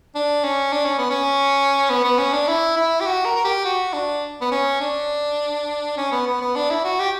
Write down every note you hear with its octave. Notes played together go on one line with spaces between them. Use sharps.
D4
C#4
D4
C#4
B3
C#4
B3
B3
C#4
D4
E4
E4
G4
F#4
A#4
A#4
G4
F#4
D4
B3
C#4
D4
C#4
B3
B3
B3
D4
E4
F#4
G4